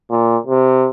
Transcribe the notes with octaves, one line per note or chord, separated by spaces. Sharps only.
A#2
C3